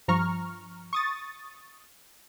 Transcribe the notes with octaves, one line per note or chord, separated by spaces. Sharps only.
G2 F3 A#5 C#6 F6
C#6 D#6 A6